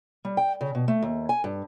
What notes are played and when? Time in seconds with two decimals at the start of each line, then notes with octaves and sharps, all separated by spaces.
0.25 G3
0.37 G5
0.61 C#3
0.75 B2
0.88 A3
1.02 D#2
1.29 G#5
1.44 G2